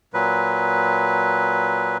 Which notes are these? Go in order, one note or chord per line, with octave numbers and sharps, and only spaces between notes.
A#2 F#3 B4